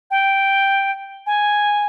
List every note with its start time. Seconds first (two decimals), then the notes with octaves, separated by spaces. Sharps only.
0.11 G5
1.26 G#5